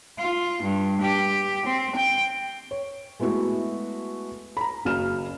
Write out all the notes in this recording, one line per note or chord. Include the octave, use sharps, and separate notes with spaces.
F4
G2
G4
C4
G5
C#5
G#3 A3 B3 E4 F#4
A#5 B5
F#1 C#3 F#3 F6 E7